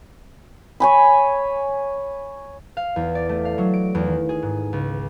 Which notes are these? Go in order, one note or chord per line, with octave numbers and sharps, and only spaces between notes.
C#5 G#5 B5
F5
E2
D5
A3
F5
F#3
D7
E2
D#3
G#4
G#2
C#2